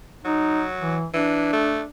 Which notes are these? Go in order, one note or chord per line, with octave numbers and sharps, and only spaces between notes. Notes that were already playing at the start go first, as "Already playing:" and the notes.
F#3 D#4
E3
E3 D4
A3